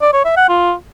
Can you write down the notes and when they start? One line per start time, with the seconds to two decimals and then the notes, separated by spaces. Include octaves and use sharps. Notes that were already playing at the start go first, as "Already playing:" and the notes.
0.01 D5
0.13 C#5
0.25 E5
0.37 F#5
0.49 F4